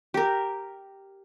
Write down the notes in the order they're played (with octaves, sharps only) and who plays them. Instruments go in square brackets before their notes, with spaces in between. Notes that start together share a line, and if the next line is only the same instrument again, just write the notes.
[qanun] G4 A#4